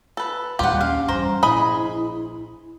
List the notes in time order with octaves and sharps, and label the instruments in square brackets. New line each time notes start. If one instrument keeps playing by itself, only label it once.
[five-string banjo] A4 B4
[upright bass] A#1 D#2 [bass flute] G3 [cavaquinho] F4 F#5 [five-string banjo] G4
[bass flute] C#4 [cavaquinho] F5
[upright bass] G2 E3 [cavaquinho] C5 A#5
[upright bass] A#1 [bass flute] E4 [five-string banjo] G#4 D#5 B5